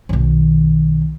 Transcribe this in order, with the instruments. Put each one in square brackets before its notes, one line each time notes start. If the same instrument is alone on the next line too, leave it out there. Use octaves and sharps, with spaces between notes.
[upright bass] B1 D#3